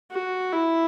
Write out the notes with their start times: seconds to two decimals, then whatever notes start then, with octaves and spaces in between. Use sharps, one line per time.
0.11 F#4
0.52 E4